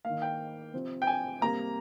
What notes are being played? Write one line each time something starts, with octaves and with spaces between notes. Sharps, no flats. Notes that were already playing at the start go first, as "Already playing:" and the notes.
D#3 A#3 F5
G5
C3 F3 C4
G5
G#5
C3 G3 A#3 A#5